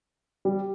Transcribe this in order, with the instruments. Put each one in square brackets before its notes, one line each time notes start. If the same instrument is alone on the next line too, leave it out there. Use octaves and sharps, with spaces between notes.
[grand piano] G3